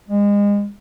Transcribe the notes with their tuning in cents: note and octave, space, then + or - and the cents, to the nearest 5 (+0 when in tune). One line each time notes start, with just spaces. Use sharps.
G#3 -30